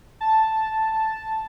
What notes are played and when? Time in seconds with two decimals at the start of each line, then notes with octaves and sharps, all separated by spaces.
0.21 A5